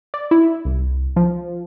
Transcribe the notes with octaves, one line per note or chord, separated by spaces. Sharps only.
D5
E4
C2
F3